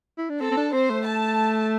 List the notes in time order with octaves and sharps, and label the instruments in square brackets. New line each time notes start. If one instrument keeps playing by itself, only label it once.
[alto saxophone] E4
D4
[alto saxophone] C4 [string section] A4
[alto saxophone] C4
D4
[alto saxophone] C4 [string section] C5
[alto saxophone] A3
[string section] A5